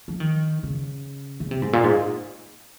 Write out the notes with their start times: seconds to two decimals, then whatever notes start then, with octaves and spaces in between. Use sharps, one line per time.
0.08 F3
0.20 D#3
0.63 C#3
1.40 C#3
1.51 C3
1.62 G#2
1.73 A#2
1.84 G#2